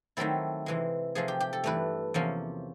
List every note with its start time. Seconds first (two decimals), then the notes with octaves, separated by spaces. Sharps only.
0.17 D#3 F#3 A3 C4 E4 A4
0.66 C3 E3 G#3
1.15 C3 F3 A3 G#4
1.28 G4
1.40 G4
1.53 A4
1.64 G2 E3 A3 D4 B4
2.14 E2 C3 F3 A#3 C#4